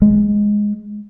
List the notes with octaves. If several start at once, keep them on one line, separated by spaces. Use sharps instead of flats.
G#3